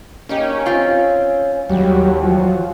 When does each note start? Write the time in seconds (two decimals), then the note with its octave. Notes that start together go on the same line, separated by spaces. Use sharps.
0.29 A#3 C#4 D#4 G4
0.66 C4 F4
1.69 D#2 F#3 G3
2.23 F3 F#3